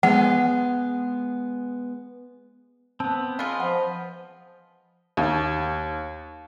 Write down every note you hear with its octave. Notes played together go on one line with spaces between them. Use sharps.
G#3 B3 F#5
B3 C4 A5
G#3 F4 B4 D#5
F3 F#5
D#2